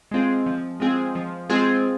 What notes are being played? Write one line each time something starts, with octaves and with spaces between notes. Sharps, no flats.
G#3 C4 F4 G#4
F3
G#3 C4 F4 G#4
F3
G#3 C4 F4 G#4